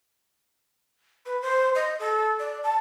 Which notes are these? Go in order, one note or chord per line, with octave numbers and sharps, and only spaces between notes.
B4
C5
D#5
A4
D5
A5